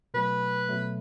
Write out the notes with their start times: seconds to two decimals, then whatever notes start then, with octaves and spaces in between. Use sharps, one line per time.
0.14 B2 F#3 A3 B4
0.69 B2 F#3 A3